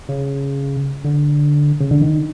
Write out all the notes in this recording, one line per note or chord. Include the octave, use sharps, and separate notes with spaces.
C#3
D3
C#3
D3
D#3